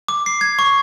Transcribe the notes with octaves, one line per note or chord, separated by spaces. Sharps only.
D6
C7
G#6
C#6